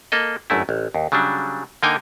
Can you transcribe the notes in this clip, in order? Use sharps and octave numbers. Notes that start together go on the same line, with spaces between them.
A#3 A4 D#5
G1 F#2 A3 E4
A1
D#2
C#3 F#3 G3 D4
D3 A#3 D#4 A#4 G5 G#5